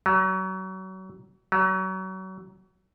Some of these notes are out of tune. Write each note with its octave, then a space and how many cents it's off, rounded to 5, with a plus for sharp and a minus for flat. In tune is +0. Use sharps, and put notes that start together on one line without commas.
F#3 +30
F#3 +30